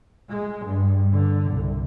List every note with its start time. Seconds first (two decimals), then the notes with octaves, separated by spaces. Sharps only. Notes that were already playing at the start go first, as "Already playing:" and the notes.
0.30 G#3
0.66 G2
1.12 D3
1.51 C2